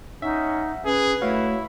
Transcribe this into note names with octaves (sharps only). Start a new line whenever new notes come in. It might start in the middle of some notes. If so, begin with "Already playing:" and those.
C#4 D#4 E5 F#5
C#4 G#4 B4
A3 E4 F#4 C#5 F5